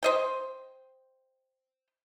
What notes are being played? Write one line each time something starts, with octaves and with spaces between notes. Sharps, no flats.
C5 D#5 G5